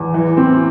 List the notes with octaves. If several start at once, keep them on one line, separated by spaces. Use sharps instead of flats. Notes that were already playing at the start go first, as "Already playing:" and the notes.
Already playing: E2
E3
C4